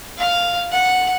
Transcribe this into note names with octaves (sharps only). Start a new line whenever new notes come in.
F5
F#5